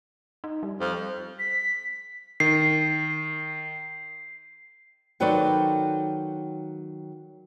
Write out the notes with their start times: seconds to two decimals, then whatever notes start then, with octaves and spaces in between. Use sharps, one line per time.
0.44 D#4
0.63 G3
0.80 F2
1.39 B6
2.40 D#3 C7
5.20 D#3 F#3 A4 B4 C5 D5